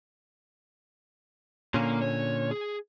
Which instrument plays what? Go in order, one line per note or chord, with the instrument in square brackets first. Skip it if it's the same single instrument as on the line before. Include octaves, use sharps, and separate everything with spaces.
[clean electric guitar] A#2 D3 C#4 [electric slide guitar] A#3
[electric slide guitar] C#5
G#4